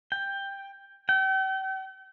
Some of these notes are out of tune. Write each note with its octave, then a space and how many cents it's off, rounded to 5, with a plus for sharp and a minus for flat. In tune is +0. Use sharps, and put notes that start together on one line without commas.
G5 +10
G5 -40